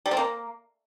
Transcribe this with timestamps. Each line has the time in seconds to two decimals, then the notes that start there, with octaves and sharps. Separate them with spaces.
0.06 G3
0.11 C4
0.17 A#3